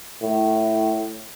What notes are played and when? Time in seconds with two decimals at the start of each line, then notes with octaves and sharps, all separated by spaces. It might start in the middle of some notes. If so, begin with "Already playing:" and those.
0.22 A2